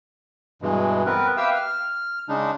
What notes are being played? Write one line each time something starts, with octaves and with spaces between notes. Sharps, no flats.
G2 B2 E3 G#3
B3 C4 A#4 B4
G4 B4 E5 F5 G5 E6
F6
C#3 G#3 D4 D#4